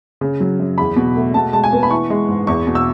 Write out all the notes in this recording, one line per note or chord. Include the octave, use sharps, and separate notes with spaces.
C#3
F#3
F#2
E2 B5
B2
A3
B2 A5
G#3 A5
G#5
B3
B5
E3 C#6
G#3
G#2
E2 C#6
B2
E6